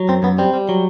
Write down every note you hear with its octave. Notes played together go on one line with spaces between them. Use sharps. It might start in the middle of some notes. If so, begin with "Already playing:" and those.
Already playing: F#3
F#2 C4
F#2 B3
G3 C4
G3
F#3